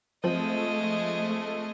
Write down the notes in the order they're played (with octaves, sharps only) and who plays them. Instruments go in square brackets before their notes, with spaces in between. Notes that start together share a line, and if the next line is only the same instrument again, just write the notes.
[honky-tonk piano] F3 C4 [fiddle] G#3 D#5 [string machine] A3